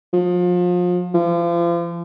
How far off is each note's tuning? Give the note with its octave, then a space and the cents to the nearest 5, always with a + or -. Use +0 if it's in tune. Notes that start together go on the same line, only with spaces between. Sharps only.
F3 +30
F3 -35